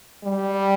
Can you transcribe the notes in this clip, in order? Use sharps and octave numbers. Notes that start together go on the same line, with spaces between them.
G3